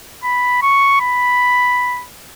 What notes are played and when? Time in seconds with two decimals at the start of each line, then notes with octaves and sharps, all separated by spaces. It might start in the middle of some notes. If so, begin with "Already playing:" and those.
0.24 B5
0.62 C#6
1.01 B5